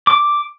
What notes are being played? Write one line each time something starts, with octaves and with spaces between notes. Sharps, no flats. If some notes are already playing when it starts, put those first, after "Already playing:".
D6